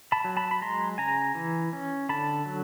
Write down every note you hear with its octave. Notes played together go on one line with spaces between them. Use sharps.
A5 B5
F#3
A5 B5
B5
G#3 A#5 C6
C#3 G#5 A#5
E3
C#4
D3 A5 B5
F#3